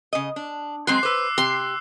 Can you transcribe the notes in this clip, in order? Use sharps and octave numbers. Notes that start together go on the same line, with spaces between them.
C#3 D#5
D4
F#3 G#3 C4 C6 F#6 C7
B4 C5 D6 E6
C3 G4 C6